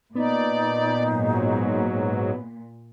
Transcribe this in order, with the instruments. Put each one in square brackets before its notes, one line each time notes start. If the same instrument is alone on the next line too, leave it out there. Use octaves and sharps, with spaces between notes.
[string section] A#2 [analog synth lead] B3 [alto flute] D#4 [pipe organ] D5
[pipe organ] G#2 F#3